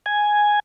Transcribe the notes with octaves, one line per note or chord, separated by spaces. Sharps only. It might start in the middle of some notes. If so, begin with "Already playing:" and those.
G#5